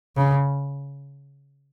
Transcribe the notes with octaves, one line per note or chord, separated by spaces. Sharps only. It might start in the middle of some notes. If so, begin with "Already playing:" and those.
C#3